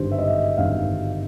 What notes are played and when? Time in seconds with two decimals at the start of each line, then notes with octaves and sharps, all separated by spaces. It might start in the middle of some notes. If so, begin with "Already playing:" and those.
Already playing: G#1 G2 D3 G3 C5
0.11 E5
0.18 D#5
0.58 G#1 G2 D3 G3 F5